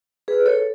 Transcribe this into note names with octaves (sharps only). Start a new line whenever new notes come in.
G#4 B4
A4 C#5